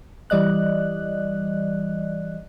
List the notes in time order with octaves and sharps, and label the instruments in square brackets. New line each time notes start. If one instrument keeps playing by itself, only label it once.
[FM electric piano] E3 G3 D5 D#5 F#6